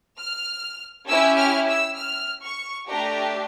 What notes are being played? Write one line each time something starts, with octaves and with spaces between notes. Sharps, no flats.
F6
C#4 E4 G4 E6
F6
E6
F6
C#6
A3 D4 G4 A#5